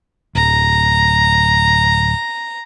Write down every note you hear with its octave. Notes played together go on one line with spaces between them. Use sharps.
D1 A#5